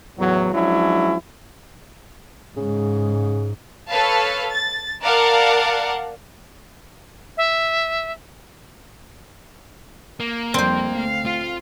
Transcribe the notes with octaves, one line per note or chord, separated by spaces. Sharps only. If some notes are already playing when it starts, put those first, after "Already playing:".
E2 A2 F#3
F3 F#3 G#3 C#4 D4 E4
G#2 C#3
A4 B4 C#5 F5 A5
A6
A#4 D5 F5 F#5 A5
E5
A#3
F2 G3 C4 C5
D2 F5
F4